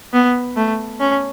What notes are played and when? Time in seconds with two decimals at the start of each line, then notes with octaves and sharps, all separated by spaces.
0.13 B3
0.56 A3
1.00 C#4